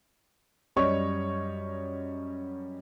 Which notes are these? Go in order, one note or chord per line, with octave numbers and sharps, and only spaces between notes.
F#2 G3 C#5 D#5 C#6